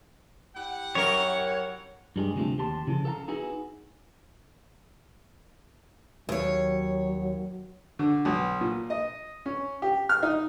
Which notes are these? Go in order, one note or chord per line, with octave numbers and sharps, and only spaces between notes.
E4 G4 F#5
F#2 A#4 C#5
G2 G3 G#3
D2 C3 F3 A3
D#2 G4 A5 C6
C#3 E3 F3 A4
A4 F5 F#5 A#5
B3 D#4 E4 F#4 G#4
D#2 F#3 C#5
D3
B1
A#2
D#5
C#4
G4
F6
D#4